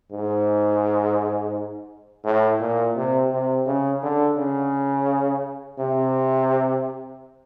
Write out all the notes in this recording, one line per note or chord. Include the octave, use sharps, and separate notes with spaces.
G#2
A2
A#2
C3
C3
C#3
D3
C#3
C3